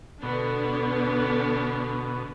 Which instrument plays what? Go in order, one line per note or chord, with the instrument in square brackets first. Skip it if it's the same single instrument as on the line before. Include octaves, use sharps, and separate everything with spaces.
[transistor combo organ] B2 [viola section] D3 B3 D4